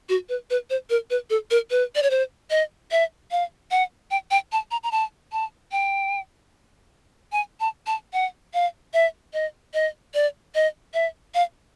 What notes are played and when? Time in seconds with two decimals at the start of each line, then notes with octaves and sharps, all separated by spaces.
0.09 F#4
0.29 B4
0.50 B4
0.70 C5
0.90 A#4
1.10 B4
1.30 A4
1.51 A#4
1.70 B4
1.95 D5
2.03 C#5
2.10 C5
2.50 D#5
2.91 E5
3.31 F5
3.71 F#5
4.11 G5
4.31 G5
4.52 A5
4.71 A#5
4.83 A#5
4.92 A5
5.32 A5
5.72 G5
7.32 G#5
7.60 A5
7.86 A5
8.13 F#5
8.54 F5
8.94 E5
9.34 D#5
9.74 D#5
10.14 D5
10.55 D#5
10.94 E5
11.34 F5